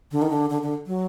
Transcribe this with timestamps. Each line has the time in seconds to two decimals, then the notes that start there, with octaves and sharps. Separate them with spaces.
0.11 D3
0.22 D#3
0.30 D3
0.50 D3
0.62 D3
0.87 F#3